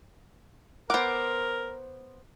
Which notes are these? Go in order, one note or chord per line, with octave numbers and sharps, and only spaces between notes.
B3 A#4 C5 F#5 D6